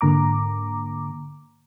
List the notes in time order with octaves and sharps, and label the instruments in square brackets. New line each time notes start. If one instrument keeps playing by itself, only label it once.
[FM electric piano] G#2 D3 A#3 A#5 D6